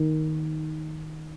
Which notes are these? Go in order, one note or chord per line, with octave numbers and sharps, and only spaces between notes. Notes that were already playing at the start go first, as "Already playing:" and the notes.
Already playing: D#3